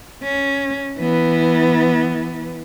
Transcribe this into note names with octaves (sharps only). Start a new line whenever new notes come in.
C#4
E3 B3